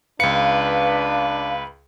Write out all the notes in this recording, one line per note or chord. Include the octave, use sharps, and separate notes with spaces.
C#2 D4 B4 F5 C#7